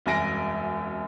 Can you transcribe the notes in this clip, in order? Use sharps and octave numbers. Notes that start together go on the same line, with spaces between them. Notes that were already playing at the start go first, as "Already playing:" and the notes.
E1 C2 F#2 G#5 A#6 D7